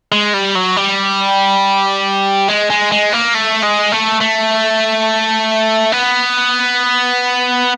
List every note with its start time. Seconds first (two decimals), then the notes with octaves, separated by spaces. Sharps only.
0.12 G#3
0.34 G3
0.56 F#3
0.77 G3
2.49 G#3
2.70 G#3
2.92 G#3
3.13 A#3
3.35 A3
3.63 G#3
3.92 A3
4.20 A3
5.92 B3